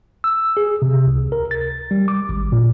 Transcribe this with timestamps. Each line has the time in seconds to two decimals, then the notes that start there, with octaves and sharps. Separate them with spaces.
0.24 E6
0.57 G#4
0.82 C3
1.06 C#2
1.32 A#4
1.51 A6
1.91 G3
2.08 D6
2.29 G#1
2.52 A#2